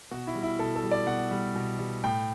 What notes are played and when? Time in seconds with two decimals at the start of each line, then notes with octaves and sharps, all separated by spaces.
0.11 B2 F#4
0.27 E4
0.35 G3
0.43 E4
0.59 B2 A4
0.76 A4
0.84 G3
0.91 D5
1.07 B2 F#5
1.31 G3
1.56 B2
1.79 G3
2.03 A2 G5